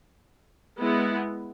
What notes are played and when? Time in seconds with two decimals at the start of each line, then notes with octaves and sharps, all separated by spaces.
0.79 G#3 B3 E4